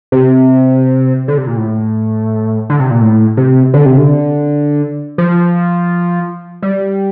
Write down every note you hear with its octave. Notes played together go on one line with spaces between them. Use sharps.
C3
D3
C3
A#2
A2
D3
C3
A#2
A2
C3
D3
C3
D3
F3
G3